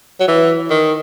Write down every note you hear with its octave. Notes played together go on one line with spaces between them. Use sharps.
F#3
E3
D#3